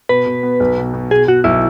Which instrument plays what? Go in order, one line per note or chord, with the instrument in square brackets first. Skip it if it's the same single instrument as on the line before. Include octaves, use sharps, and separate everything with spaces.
[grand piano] B2 [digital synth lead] B4
[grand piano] B2
B3
B1
B2
B2
[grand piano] B2 [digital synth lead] G#4
[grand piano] B2 [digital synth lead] F#4
[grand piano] B1 [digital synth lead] E4